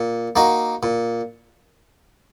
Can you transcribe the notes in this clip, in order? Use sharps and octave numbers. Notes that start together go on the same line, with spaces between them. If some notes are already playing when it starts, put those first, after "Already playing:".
Already playing: A#2
A#3 D#4 F#4
A#2